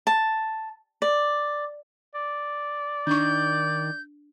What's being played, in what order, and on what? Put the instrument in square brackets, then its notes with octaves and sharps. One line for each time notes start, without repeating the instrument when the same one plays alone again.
[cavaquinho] A5
D5
[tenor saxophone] D5
[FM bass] D#3 [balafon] D4 C#6 [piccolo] G6